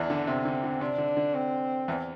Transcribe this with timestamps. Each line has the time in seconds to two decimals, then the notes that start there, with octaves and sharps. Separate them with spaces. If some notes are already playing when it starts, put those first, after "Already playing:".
Already playing: E2 E3 D4
0.10 D3
0.27 C3 C4
0.45 D3
0.64 D3
0.81 C3 D4
0.98 D3
1.17 D3
1.35 C4
1.88 E2 E3